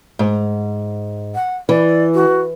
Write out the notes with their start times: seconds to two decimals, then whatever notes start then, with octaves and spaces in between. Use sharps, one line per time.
0.19 G#2
1.35 F#5
1.69 E3 D5
2.14 F#4